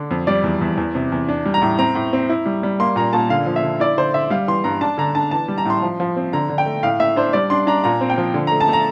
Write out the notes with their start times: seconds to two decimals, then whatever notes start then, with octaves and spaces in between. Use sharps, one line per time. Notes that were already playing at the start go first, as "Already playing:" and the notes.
Already playing: D3 D4
0.11 F2
0.27 G3 D5
0.44 E2
0.61 E2
0.77 E2
0.95 C3
1.12 E2
1.29 D4
1.46 G3
1.54 A#5
1.62 A2
1.78 C4 A#5
1.95 A2
2.13 C4
2.29 E4
2.46 G3
2.63 G3
2.80 A#3 C6
2.96 A#2 A#5
3.13 A#2 A5
3.30 D3 F5
3.46 F3
3.56 E5
3.63 D3
3.80 E4 D5
3.98 D3 C5
4.14 D3 E5
4.30 G3 F5
4.48 E3 C6
4.64 G2 A#5
4.81 D4 A5
4.98 D3 A#5
5.15 D4 A5
5.31 E3 A5
5.48 G3
5.58 A#5
5.65 A2 C6
5.82 F3
6.00 F3
6.16 C4
6.33 D3 A#5
6.49 D3
6.58 G5
6.66 A3
6.83 A2 F5
7.00 A2 E5
7.16 D4 C5
7.33 G3 D5
7.50 D4 C6
7.67 D4 A#5
7.84 A#2 A#5
8.01 C4
8.10 G5
8.18 F3
8.34 D3
8.47 A3 A#5
8.61 A5
8.69 A3 A#5